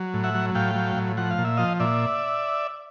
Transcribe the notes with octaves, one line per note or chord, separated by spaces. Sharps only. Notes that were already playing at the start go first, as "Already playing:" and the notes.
Already playing: F#3
A2
E5 F#5
F#3
A2 F5 G5
F#3
A2
F3 F#5
F5
A#2
E5
F3 D#5 F5
A#2 D5 E5